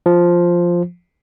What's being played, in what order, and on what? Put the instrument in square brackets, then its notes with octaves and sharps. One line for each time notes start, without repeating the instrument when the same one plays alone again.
[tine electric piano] F3